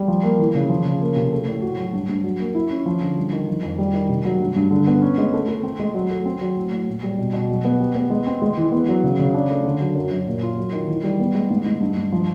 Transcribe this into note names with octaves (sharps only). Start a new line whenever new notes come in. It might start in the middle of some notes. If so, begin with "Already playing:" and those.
Already playing: G3
F3
A#3
E3
C#3
F3
C#3
A#3
C3
A3
A2
F#4
F#3
G2
G2
F#3
A#3
E4
C#4
F3
D3
G3
D#3
F3
F2
G3
D#3
C3
F#3
G2
G2
D3
B3
C#4
G#3
A3
A3
C4
G#3
F#3
A3
C4
F#3
A2
A2
A#2
G3
B2
B2
F#3
B3
G4
B3
G#3
C4
G#3
E3
B3
F#3
C#3
C#3
D4
A3
D3
F#3
F#2
F#2
A#2
F4
F#3
D#3
E3
G3
B3
G#3
G#2
G#2
G2
G2
F3